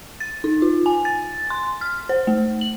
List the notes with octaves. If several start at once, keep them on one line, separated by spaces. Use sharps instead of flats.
A6
D#4
F4
G#5
A6
C6
F6
C5
A3
F#7